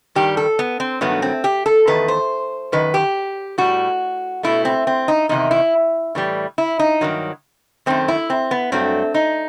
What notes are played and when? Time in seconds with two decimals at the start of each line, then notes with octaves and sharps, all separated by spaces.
0.15 G2 D#3 G3 G4
0.37 A4
0.59 B3
0.80 C4
1.01 G2 D#3 F#3 A3 B3
1.22 C4
1.44 G4
1.66 A4
1.87 E2 D#3 A3 B4
2.08 C5
2.72 F#2 D#3 B4
2.94 G4
3.58 A2 G3 F#4
4.43 B2 A3 E4
4.65 C4
4.87 C4
5.08 D#4
5.29 E2 C3 D#3 D#4
5.51 E4
6.15 A2 E3 G3
6.58 E4
6.79 D#4
7.01 G2 D#3 F#3
7.86 F#2 D#3 A3 C4
8.08 E4
8.30 C4
8.51 B3
8.72 G2 F#3 A3 C4
9.14 D#4